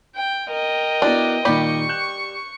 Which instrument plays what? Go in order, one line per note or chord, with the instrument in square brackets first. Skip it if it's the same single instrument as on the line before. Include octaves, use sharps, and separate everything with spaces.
[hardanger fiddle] G5
[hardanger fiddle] A#4 [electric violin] D#5 G5
[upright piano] B3 E4 F#4 [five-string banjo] D4
[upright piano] A#2 D#3 [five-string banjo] G3 G4 B5 [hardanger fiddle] C#6
[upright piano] F#6 G6 E7